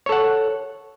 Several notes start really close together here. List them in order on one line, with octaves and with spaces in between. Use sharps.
C#5 A4 F#5